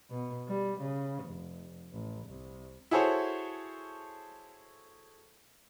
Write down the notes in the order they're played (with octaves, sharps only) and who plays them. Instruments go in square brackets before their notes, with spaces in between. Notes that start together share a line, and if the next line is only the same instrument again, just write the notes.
[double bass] B2
G3
C#3
F1
A1
C2
[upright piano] E4 F#4 G#4 A4 C5 C#5